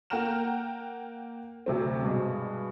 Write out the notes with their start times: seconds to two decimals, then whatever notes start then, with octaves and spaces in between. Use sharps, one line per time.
0.10 A#3 F#5 G5 A#5 F6 E7
1.66 D2 C3 F#3 C4
2.03 G2 B2 G#3